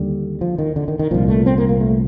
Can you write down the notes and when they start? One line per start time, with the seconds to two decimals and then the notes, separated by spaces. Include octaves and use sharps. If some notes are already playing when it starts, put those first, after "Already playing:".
Already playing: D#2 D3 G3
0.41 F3
0.58 D#3
0.76 D3
0.88 D#3
0.99 D#3
1.11 C2 A#2 F3
1.28 A3
1.46 C4
1.58 A#3
1.69 A#3
1.81 A3